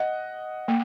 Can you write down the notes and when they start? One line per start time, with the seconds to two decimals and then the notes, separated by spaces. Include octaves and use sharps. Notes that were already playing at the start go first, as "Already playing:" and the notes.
Already playing: D#5 F#5
0.68 A#3